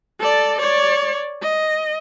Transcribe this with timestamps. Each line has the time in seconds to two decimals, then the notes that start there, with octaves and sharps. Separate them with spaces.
0.20 A4 D5
0.59 C#5 D5
1.42 D#5